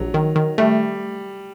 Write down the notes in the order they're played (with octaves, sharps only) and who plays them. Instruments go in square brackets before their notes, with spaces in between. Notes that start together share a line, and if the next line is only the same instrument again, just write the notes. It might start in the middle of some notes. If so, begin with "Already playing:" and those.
Already playing: [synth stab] A#1 [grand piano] F#3
[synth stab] D#3
D#3
[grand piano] G3 [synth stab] A3